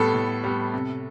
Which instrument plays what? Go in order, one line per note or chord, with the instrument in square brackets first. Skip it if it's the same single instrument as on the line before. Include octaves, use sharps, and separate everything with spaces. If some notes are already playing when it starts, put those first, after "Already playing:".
Already playing: [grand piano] A2 G3 B3 A4
A2
G3 B3
C3